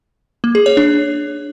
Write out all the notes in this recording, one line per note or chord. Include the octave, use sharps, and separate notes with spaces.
A#3
G#4
C#5
D4